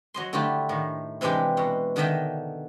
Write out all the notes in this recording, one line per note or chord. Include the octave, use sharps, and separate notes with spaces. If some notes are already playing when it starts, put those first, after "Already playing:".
F#3 D#5 C6
D3 A3 E4 F4 G4
A2 D#3
C3 E3 G#3 D4 G4
B2
D3 D#3 A4 D#5 E5 G5